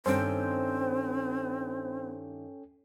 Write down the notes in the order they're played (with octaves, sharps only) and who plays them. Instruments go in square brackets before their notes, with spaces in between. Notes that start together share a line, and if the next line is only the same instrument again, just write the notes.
[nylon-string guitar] G2 D#3 [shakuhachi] C4 [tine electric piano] C#4 A4 G5 [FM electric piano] C5